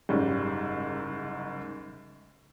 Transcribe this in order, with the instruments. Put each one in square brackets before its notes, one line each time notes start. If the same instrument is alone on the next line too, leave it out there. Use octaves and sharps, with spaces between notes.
[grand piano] F#1 G#2 [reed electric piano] C#3 G3 G6